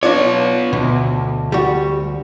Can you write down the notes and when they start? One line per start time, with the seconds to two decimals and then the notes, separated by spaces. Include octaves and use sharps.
0.03 B3 D4 F4 C#5 D5
0.73 D2 B2
1.52 G3 F#4